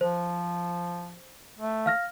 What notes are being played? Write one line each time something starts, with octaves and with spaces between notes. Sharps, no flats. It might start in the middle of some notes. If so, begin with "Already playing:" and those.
F3 C5
A3
F5 F6 A#6